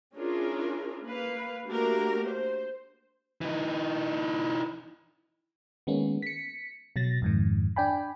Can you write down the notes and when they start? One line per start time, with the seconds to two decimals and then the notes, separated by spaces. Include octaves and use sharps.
0.15 C#4 D4 E4 F4 G#4 A#4
1.05 A#3 B4 F5
1.67 A3 A#3 D4 F#4 G4 A#4
2.29 C5
3.41 E3 D#4
5.87 D#3 G#3 A#3 B3 C#4
6.22 B6 C#7
6.96 B2 F#3 A6 A#6
7.22 F2 G#2 D#3
7.76 D4 D5 G5 G#5 B5